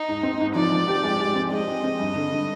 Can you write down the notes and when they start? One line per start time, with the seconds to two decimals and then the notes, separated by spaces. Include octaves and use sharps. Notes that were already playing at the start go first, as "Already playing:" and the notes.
Already playing: D#4
0.08 G#2
0.23 C4
0.40 G#2
0.55 F3 D5
0.72 F3
0.88 G4
1.03 G#3
1.19 G#3
1.35 C4
1.51 G#3 D#5
1.68 C4
1.84 C4
2.00 G2
2.16 D3
2.32 D3